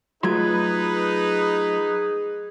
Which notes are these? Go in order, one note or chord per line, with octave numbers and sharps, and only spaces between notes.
F#3 A3 D#4 F4 G#4 B4 C6 G#6